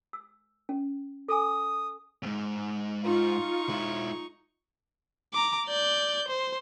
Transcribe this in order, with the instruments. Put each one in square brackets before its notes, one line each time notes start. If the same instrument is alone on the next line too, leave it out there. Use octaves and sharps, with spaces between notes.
[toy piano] E6
C#4
[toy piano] A4 G#5 [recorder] D#6
[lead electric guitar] E2 G#2
[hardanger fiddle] D#4 C#6 [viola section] F4
[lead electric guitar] G#3 E4
[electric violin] A#5 D6
D5 G6
C5